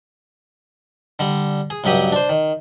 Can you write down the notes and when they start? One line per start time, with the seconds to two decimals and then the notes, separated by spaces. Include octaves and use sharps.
1.19 D3 G3
1.70 G#4
1.84 C#2 G2 F#3 G4 D#6
2.12 D4 C5
2.29 D#3